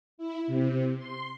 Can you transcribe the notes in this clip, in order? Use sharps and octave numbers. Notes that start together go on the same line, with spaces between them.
E4
C3
C6